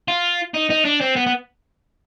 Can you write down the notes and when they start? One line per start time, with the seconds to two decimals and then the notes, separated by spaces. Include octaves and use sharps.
0.08 F4
0.54 D#4
0.70 D#4
0.85 D4
1.00 C4
1.16 B3
1.27 B3